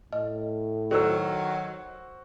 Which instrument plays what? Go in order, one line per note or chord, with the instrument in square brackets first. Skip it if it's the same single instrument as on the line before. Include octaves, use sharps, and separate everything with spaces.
[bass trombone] A2 [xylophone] D#5
[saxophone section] D#3 F#3 [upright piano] F#4 C5 E6 [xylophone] A4 D5